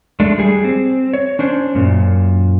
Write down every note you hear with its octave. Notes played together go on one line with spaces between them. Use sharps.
G#3 A3 D4
G3 G#4
C4
C#5
C#4 D4 C5
F#2 A#2